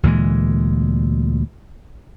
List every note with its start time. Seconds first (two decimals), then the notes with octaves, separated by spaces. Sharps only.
0.03 D2 A#2 E3 G#3